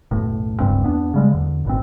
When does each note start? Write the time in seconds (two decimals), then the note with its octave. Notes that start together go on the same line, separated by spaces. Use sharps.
0.11 F#1 B1 A2
0.60 D1 C#2 G2 C4
0.83 E2 B3 D4
1.14 C#3 G3 G#3
1.31 E2 D3
1.65 G#1 B2 C4